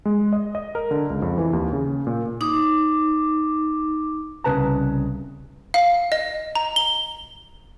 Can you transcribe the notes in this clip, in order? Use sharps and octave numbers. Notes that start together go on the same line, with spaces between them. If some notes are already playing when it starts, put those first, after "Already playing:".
G#3
D#5
D#5
A#4
D3
C#2
F2
E3
D#2
C#3
A#2
D#4 D6
C2 C#3 B4 A5 A#5
F5
D#5
A#5
G7